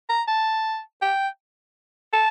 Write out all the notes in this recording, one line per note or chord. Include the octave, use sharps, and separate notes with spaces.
A#5
A5
G5
A5